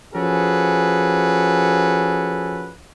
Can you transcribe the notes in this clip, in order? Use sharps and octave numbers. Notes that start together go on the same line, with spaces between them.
F3 C#4 F#4 G#4 A4 B4